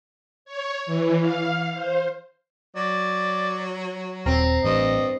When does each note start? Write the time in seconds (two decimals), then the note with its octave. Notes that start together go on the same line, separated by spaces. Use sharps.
0.45 C#5
0.86 E3
1.18 F5
1.74 C5
2.76 F#3 D5
4.26 D#1 C4 A#5
4.65 A1 G2 D#5